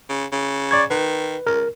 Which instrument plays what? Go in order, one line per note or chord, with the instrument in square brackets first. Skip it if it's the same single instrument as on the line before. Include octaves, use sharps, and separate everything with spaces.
[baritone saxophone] C#3
C#3
[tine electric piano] D5 C#6 G#6
[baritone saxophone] D#3 [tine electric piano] B4
[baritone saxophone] C#2 [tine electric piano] A#4